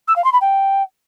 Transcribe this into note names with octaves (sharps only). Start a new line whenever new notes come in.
E6
F5
C6
B5
G5